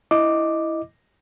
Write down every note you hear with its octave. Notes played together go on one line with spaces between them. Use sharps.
E4 D#5 D6